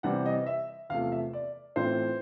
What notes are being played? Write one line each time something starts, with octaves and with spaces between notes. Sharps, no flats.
C3 E3 G3 C4 F#5
D#5
E5
E2 C3 F3 A3 F5
E5
D5
A2 E3 A3 C4 F4 C5